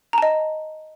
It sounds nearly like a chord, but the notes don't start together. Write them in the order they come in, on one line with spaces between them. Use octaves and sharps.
A#5 A5 D#5